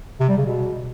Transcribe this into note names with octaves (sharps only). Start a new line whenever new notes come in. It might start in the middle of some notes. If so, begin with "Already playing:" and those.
C3
G3
C#3
B2